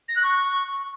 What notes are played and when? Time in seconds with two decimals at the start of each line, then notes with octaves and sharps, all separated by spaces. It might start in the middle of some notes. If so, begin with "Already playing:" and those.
0.08 A#6
0.16 F#6
0.23 C#6